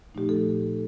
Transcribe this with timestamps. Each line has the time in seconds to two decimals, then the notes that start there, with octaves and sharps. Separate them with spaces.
0.15 A#2 F3 A3 D#4 G4
0.29 A4